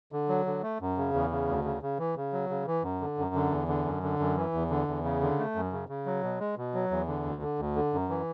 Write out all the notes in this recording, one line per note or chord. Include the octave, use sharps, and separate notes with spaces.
D3
F#3
D3
A3
F#2
C#3
E2
C#3
D2
C#3
C#3
E3
C#3
F#3
C#3
E3
F#2
D3
F#2
D3
E2
D3
F#2
D3
F#2
E3
E2
D3
E2
C#3
D3
A3
F#2
C#3
C#3
F#3
B2
G#3
B2
F#3
E2
D3
D2
D3
D2
D3
F#2
E3